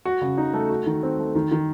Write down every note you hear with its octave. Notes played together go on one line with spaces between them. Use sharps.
F#4
C#3
D#4
A3
F#4
D#3
C4
A3
D#3
D#3